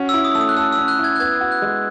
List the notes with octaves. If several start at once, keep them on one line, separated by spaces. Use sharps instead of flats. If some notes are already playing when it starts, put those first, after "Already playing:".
Already playing: C#4 F#4
E4 E6
D#6
A3 E6
D#6
F#6
A4 E6
E6
C#4
F#6
E4
G#6
F#6
B3 G#6
F#4
F#6
G#3